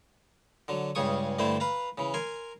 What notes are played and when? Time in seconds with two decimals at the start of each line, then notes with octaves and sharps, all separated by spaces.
0.68 D3 F#3
0.95 C#2 G2 C#3 G#4 C#6 D#6
1.39 G2 D3 A3 E4 C5
1.60 B4 F5 A#5
1.98 C#3 E3
2.14 A#4 G#5 C6